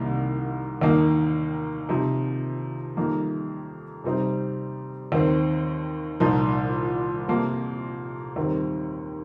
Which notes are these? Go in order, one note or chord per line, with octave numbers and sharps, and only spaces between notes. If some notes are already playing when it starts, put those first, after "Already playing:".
Already playing: C2 C3 D#3 A#3 D#4
D#2 D#3 A#3 D#4
C3 F3 D#4
F2 D#3 G3 A#3 D#4
C3 G3 C4 D#4
D#2 D#3 C4
C2 A#2 F3 D#4
F2 C3 F3 A#3
D#2 D#3 G3 C4